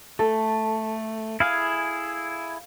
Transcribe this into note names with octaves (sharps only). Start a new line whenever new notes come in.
A3 A4
E4 G#4 F5 G#5